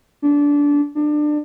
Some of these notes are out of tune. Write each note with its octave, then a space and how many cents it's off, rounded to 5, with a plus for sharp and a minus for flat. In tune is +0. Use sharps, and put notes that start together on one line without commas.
D4 -20
D4 +25